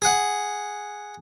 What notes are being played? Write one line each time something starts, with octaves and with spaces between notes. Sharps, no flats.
G#4 F#5